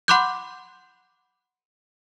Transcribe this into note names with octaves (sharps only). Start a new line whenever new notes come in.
F#5 B5 C6 D6 F#6 G6